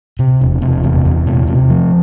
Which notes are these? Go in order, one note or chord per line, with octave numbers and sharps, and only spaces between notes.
C3
E1
C3
E2
E2
C3
C3
F3